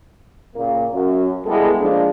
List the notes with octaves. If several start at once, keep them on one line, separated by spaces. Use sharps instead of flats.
A#2 C#3 A#3
F#2
G3 G#3 B3 E4 G#4 A4
F3 G#3 A#3 D4